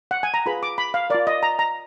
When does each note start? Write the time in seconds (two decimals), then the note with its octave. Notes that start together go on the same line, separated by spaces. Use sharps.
0.11 F#5
0.23 G#5
0.34 A#5
0.46 F4 G#4 B4 B5
0.63 D6
0.78 B5
0.94 F5
1.10 F4 A#4 D5
1.27 D#5
1.43 A#5
1.59 A#5